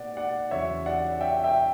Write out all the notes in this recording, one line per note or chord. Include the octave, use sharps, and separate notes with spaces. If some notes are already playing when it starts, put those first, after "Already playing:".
Already playing: B2 A#3 D5 F#5
D5 F#5
E2 C#3 F#3 C#5 E5
D5 F#5
E5 G5
E5 G5